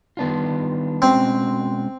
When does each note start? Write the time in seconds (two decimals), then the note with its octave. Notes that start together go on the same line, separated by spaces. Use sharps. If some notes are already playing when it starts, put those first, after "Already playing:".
0.17 D#3 G3 B3 D4 F4
1.02 B2 G#3 C4 C#4 F#4